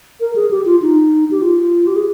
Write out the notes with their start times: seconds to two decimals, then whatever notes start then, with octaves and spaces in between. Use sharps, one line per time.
0.20 A#4
0.36 G#4
0.51 G4
0.65 F4
0.82 D#4
1.31 G4
1.42 F4
1.87 G4
1.96 G#4